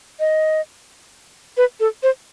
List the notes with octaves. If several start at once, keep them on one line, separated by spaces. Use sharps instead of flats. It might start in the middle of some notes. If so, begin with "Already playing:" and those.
D#5
B4
A4
C5